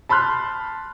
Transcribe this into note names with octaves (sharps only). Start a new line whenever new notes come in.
A5 B5 C6 F6 F#6